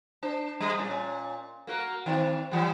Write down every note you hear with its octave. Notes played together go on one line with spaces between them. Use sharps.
D4 C5
G3 D#5
A#2 C#4
A#3 F#4 A#4
D#3 C4 D5
E3 G3